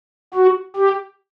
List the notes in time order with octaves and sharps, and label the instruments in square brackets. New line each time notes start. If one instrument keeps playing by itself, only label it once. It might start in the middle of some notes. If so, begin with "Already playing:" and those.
[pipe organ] F#4
G4